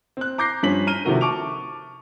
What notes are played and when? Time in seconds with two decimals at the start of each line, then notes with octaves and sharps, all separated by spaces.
0.17 C4 F#6
0.38 A#5 D6 G6 A#6 C7
0.63 G2 F3 C#4 C5 B6 F#7
0.87 A#5 F6 D#7 G7
1.05 C3 D#3 F3 A3 F#4 A#4
1.21 A5 C#6 D6 D7 F7